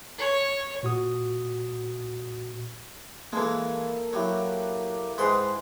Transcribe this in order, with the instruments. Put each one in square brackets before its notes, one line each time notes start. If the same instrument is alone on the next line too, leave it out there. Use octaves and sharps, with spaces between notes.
[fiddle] C#5
[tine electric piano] A#2 F#4 D#6
[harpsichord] E3 G#3 [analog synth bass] A#3 [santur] A4 A5
[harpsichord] F#3 [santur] E4 G4 F#5
[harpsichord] G#2 B4 C6 [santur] G#3 G5 B5